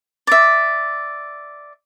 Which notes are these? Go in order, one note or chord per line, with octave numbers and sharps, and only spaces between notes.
D5 E5